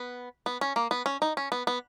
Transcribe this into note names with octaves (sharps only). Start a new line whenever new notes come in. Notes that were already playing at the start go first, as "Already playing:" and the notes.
Already playing: B3
B3
C#4
A#3
B3
C#4
D#4
C#4
B3
B3